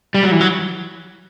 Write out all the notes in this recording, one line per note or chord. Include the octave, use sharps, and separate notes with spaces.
G3
F#3
E3
F#3